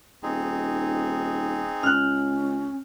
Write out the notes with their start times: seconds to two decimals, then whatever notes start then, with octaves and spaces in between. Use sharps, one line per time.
0.23 D#1 C4 D#4 G#4
1.83 C#2 C#4 F6 F#6